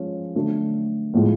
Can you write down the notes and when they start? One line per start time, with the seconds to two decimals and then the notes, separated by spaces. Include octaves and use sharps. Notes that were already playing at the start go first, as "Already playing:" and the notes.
Already playing: F3 G#3 C#4
0.35 D3 F#3 A3 D4
1.14 A2 F3 G#3